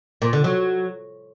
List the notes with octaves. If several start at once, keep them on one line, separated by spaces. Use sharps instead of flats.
A#2
D3
F#3